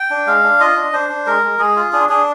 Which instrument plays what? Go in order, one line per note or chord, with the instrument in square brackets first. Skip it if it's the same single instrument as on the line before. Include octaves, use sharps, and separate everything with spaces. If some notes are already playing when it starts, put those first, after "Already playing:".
Already playing: [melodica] G5
D4
G#3 F5
D4
F4 D#5
D4
D4 C5
D4
G#3 A#4
G#3
G#3 G#4
F4
D4 G#4
D4 G#4